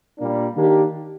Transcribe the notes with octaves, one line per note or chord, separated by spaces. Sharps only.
A#2 G3 A#3 D4
D#3 A#3 D4 G4